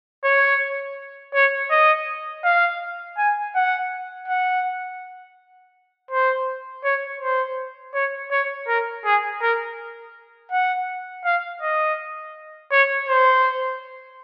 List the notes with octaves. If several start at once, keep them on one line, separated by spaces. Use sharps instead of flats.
C#5
C#5
D#5
F5
G#5
F#5
F#5
C5
C#5
C5
C#5
C#5
A#4
G#4
A#4
F#5
F5
D#5
C#5
C5